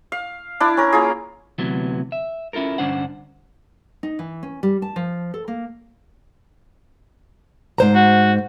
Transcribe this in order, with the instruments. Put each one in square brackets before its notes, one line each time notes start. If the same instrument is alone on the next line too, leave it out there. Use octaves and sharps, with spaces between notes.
[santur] F5
D4 E4 D6
C#4 A#4
A#3 F4 G#4
[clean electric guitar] D2 C3 E3 F#3 B3
E5
C#4 E4 F4 A4 A#4
G2 D3 C#4 D4 C5 F#5
[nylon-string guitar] D#4
E3
C#4
G3
A5
F3
A4
A#3
[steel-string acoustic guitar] G#2 C5 A#5
[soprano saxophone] F#4